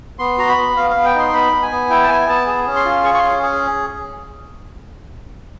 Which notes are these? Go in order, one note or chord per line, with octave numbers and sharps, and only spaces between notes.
B3 C6
F#4 A#5
B5
B3
B3 F5
F5
B3
G5
D#4 C6
B3 B5
B3
G#5
B3
E4 G5
A5
B3 G#5
B3 A5
G#4
C#4
C6
F4
G#4 C#6
C#6
C#4 C6
G#4